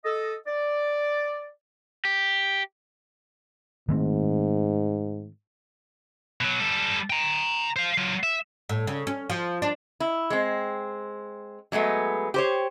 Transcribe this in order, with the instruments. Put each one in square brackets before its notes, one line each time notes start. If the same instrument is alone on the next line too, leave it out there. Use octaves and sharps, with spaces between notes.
[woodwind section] A4 D#5
D5
[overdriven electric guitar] G4
[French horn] G#2 [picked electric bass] D#3 A3 C4
[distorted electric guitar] B2 F#3
G3 A4
G5 A#5
C5 F5
F#3 F4
E5
[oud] A2
C#3
C#4
F3
D4
[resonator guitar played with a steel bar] E4
G#3 C4
F#3 G#3 A3 B3
G4 C5 C#5